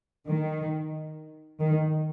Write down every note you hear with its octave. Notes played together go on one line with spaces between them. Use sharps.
D#3
D#3